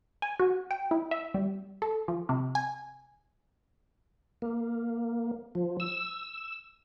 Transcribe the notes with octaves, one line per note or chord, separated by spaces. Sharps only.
G#5
F#4
G5
E4
E5
G3
A4
F3
C3
G#5
A#3
F3
E6